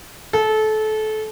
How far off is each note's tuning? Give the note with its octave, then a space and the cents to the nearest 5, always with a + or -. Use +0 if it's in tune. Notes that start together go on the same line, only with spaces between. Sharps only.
A4 -25